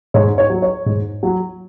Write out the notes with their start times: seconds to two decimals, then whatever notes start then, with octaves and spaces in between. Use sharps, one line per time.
0.14 G#2 C#5
0.38 C#5
0.50 F#3
0.62 C#5
0.86 G#2
1.23 F#3